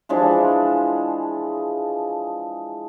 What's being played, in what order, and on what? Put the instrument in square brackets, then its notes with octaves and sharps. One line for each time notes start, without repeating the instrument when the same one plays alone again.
[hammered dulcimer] E3 F3 G#3 D4